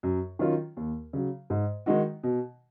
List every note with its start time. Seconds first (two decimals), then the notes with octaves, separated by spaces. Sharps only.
0.03 F#2
0.39 D#3 F#3 C#4 F4
0.77 D#2
1.13 C#3 F#3
1.50 G#2
1.86 D#3 G#3 D#4 F#4
2.23 B2